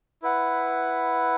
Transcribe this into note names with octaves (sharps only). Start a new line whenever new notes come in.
E4 B4 F#5